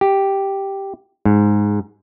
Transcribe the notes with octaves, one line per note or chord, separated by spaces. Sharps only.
G4
G#2